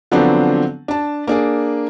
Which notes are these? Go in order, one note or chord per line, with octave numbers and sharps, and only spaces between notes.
D3 F3 F#3 B3 C4 D4
D4 A5
A#3 D4 G#4